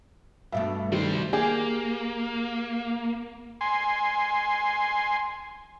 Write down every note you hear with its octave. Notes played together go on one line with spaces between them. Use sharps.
G2 B2 A3 E5
D#3 G3 G4 C5
A#3 G4 G#4
G#5 C6